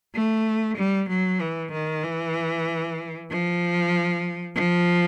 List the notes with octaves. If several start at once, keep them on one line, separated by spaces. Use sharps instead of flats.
A3
G3
F#3
E3
D#3
E3
F3
F3